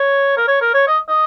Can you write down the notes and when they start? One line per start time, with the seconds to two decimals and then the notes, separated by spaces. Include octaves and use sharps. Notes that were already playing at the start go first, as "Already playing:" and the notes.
Already playing: C#5
0.37 A#4
0.48 C#5
0.61 A#4
0.74 C#5
0.87 D#5
1.08 D#5